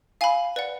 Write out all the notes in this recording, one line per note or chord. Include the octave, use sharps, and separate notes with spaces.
F5 G#5 B5
B4 D5 F#5